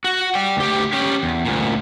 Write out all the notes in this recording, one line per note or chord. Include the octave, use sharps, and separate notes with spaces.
F#4
D5 G5
D2 G4
C#4 G4
E2
D2 A#2